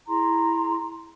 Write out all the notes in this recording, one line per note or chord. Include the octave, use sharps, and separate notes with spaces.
E4 G#4 A#5 C6